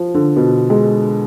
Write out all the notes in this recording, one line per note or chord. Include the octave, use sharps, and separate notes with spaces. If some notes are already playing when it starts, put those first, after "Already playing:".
Already playing: F3
D3
B2
G#3